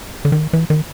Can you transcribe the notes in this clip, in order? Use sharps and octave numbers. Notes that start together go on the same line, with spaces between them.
D3
D#3
E3
D#3